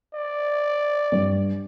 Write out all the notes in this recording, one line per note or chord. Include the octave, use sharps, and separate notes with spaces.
D5
G2